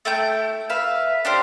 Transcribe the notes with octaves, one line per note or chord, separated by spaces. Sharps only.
A3 E4 G5 G6
B4 E5 F5
D4 G4 C5 F5